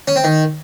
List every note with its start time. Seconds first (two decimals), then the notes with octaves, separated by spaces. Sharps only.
0.08 C#4
0.16 C4
0.24 D#3